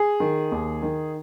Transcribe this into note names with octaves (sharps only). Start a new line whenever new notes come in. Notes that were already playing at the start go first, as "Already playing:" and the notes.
Already playing: G#4
D#3
D#2
D#3